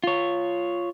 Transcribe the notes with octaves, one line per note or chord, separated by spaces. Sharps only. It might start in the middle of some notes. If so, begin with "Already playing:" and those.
F4 C#5